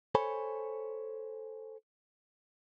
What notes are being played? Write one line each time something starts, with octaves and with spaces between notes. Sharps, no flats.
A4 C5 C#5 G#5 B5